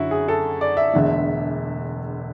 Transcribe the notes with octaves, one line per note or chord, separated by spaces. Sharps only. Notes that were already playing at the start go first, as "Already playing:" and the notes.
Already playing: F#2 D3 F#3 E4 F#4
G#4
A4
D5
E5
E1 E2 D3 A3